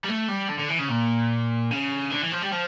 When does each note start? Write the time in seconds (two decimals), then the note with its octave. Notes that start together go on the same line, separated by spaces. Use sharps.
0.04 G3
0.08 A3
0.28 G3
0.49 D3
0.59 D3
0.70 E3
0.79 C#3
0.89 A#2
1.71 C#3
2.12 D3
2.22 E3
2.32 F3
2.42 G3
2.52 F3